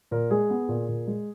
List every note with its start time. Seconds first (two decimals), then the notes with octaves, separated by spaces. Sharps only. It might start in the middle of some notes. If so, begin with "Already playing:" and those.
0.11 A#2 A#4
0.31 G#3 G#4
0.50 B3
0.69 A#2
0.89 A#2
1.07 G#3